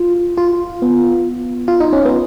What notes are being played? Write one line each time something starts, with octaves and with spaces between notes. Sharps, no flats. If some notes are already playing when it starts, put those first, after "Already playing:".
Already playing: F4
F4
B3
F4
D#4
C#4
B3